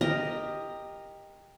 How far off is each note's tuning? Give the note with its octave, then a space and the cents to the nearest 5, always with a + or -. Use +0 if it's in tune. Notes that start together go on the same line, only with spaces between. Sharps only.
G4 +15 A#4 +0 D#5 +0